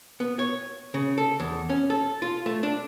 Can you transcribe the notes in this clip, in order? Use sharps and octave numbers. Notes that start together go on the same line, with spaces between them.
B3
C#5
C#3
A4
E2
C#4
A4
F4
A3
D4